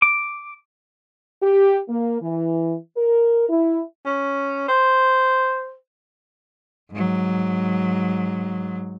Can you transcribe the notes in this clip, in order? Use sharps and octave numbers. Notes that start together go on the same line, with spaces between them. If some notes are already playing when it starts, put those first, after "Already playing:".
D6
G4
A#3
E3
A#4
E4
C#4
C5
G#2 F#3